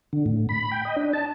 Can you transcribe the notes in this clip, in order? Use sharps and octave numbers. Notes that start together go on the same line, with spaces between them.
D3
A2
B5
G5
D#5
D4
A5